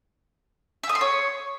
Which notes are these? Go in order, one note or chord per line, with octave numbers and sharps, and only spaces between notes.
E5
D#6
C6
C#5